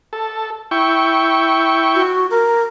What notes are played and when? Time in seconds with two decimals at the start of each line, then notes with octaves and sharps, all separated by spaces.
0.13 A4
0.71 E4 G5 C#6
1.95 F#4
2.31 A#4